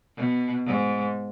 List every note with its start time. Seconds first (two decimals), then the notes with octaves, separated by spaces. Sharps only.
0.17 B2
0.67 G#2